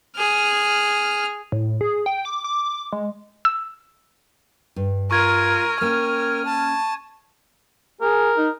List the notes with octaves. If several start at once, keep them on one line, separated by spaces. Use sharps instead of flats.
G#4 F6
A2
G#4
G5
D6
D6
G#3
E6
G2
F4 A#4 C#6 G#6 D#7
A#3 C#4 A#4 G5 F6
A5
G#4 A#4
D#4